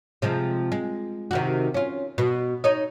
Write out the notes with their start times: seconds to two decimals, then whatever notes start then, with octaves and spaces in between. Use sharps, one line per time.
0.22 C3 F3 G#3
0.72 G#3
1.31 C3 D#3 F#4
1.74 C#4 F4
2.18 B2
2.64 D#4 C#5 D#5